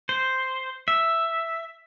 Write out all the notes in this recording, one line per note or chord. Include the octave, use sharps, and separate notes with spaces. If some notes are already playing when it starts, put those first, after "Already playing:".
C5
E5